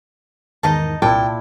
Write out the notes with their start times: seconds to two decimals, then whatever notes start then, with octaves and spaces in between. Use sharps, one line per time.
0.63 E2 G#2 D#3 D#4 D#5 A5
1.02 C2 A#2 E4 G5 A5